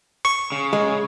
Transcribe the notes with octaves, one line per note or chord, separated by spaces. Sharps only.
C#6
C#3
G#3